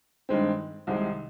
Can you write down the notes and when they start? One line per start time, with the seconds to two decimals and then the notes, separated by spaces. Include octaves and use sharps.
0.29 G2 D#3 G#3 C4
0.87 C2 C3 D#3 G#3